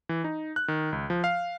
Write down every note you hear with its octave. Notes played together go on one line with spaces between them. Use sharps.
E3
D#4
F#6
D#3
C#2
F3
F5